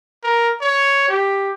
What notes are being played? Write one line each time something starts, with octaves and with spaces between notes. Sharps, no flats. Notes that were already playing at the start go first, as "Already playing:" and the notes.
A#4
C#5
G4